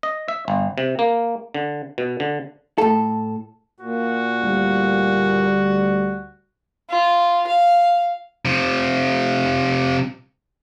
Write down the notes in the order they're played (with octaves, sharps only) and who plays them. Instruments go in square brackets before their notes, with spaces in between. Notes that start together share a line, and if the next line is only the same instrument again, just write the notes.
[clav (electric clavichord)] D#5
E5
G1
C3
A#3
D3
B2
D3
[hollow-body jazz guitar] A2 A4
[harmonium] A#2 [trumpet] F#4
[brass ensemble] D2 G3
[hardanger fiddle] F4
F5
[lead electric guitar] C3 F3